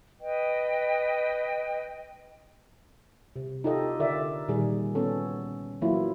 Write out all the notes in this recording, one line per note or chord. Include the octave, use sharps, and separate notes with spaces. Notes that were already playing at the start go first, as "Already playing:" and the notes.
B4 D#5 G5
C3
D#4 F4 G4 A4 D#5
D3 A#4 D5 E5
A#2 D#3 G3 G#4
B3 C#4 A4
E3 F#3 A#3 E4 F4